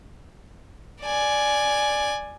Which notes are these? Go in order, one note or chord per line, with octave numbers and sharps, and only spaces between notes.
D5 G#5